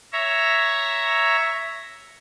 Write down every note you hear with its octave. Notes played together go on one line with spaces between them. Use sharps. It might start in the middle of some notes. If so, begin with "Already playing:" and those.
C#5 E5 A#5